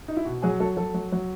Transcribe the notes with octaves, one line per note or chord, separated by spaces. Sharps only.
D#4
E4
B2 F#4
F#3 G#4
F#3 A4
F#3 A4
F#3
F#3